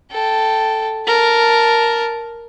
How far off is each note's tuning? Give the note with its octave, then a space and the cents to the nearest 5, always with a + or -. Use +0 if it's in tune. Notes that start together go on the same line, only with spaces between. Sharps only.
A4 +0 G5 -10
A#4 +0 A5 +0